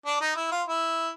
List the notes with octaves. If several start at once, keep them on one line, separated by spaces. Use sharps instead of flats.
D4
D#4
E4
F4
E4